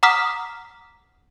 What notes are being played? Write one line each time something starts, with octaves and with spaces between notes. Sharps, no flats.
F#5 A#5 D6 D#6 F6 B6